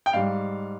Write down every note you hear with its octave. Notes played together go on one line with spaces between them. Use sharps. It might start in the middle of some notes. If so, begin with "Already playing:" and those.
G5
G#2 G3 F5